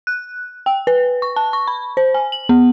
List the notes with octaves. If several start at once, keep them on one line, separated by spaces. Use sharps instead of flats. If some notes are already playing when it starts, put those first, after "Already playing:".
F#6
G5
B4
C#6
A5
C#6
B5
C5
G#5
F#7
B3